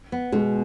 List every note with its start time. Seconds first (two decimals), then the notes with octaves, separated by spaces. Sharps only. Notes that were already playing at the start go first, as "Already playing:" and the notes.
0.12 B3
0.32 B2 G#3